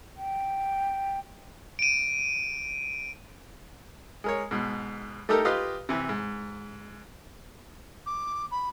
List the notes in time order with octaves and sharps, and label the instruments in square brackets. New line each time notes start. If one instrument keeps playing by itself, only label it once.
[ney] G5
[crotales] D7 D#7
[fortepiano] G#3 A#4 C#5
G#2 B2
A3 D#4 G4 A4 A#4 A#5
F4 G4 B4 D#5 F5
C3 E3
G#2
[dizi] D6
B5